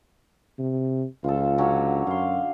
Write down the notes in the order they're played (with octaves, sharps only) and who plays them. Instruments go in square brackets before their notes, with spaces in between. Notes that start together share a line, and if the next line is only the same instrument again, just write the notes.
[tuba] C3
[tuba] C#2 [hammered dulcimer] F4 A4
[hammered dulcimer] D3 F#3 C#4
[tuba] F#2 [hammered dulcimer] F5 C6